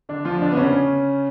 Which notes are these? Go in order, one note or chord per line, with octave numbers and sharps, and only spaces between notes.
D3 D4
F3 F4
D3 D4
B3
C#3 C#4